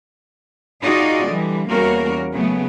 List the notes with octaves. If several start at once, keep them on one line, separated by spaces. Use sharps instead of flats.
D#4 F4 F#4 G#4 D5 D#5
D3 E3 G3
E2 G3 A#3 C#4 F#4 A#4
C#3 F#3 A3 B3